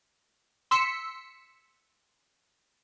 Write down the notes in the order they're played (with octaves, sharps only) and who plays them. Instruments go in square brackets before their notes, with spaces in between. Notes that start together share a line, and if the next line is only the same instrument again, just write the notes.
[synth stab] C6 E6 B6 C#7